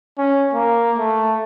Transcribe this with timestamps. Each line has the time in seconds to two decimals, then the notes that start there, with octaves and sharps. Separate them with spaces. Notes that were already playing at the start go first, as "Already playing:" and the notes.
0.18 C#4
0.53 A#3
0.98 A3